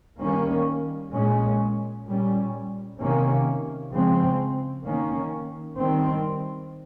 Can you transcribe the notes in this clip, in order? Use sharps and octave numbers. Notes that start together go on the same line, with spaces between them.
D#3 G3 A#3 C#4
A#2 G#3 C#4
A#2 G3 C#4
C3 D#3 A#3 C#4
C#3 F3 G#3 C4
D#3 A#3 C#4
D#3 G3 C4